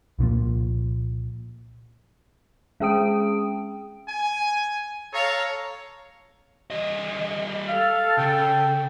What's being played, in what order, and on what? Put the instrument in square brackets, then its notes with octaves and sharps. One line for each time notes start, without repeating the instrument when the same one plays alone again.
[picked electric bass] C2 A#2 F3 A#3
[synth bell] G#3 C#4 G#4 G5 D#6 D7
[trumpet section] G#5
A4 C#5 F5 A#5
[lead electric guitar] G3 D#5
[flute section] A4 [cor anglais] F5
[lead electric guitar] C#3 [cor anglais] G5